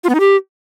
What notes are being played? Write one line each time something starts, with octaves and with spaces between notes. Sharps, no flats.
F4
B3
D#4
G4